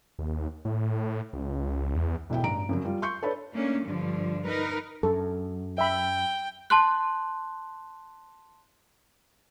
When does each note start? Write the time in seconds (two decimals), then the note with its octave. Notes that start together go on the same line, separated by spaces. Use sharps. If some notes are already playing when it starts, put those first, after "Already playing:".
0.19 D#2
0.65 A2
1.33 C#2
1.96 E2
2.30 E1 B1 E4 G5
2.43 A1 G2 A#5 D7
2.69 F#2 C#3 F#3
2.85 G3 F4
3.02 C6 C#6 G6 C#7
3.22 D4 A4 B4 C#5 D5 B5
3.52 A3 A#3 C#4 D4
3.85 G2 D3 F3
4.45 D#4 A#4 B4
5.03 F#2 A4
5.78 E5 G5 B5
6.70 A5 C6 F#6